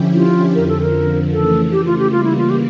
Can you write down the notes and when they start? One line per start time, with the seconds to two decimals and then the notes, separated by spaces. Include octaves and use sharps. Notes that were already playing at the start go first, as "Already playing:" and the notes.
Already playing: D3 F3 C#4 E4 G4
0.15 F4
0.55 F2 D3 F3 A#4
0.69 A4
0.81 A#4
1.33 C#3 E3 A3 A4
1.72 G4
1.85 F4
1.99 G4
2.12 C#3 E3 G3 A#3 F4
2.24 E4
2.37 F4
2.50 G4